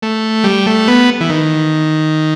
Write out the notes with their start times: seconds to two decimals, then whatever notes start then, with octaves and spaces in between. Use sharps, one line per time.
0.02 A3
0.44 G3
0.66 A3
0.88 B3
1.21 E3
1.29 D#3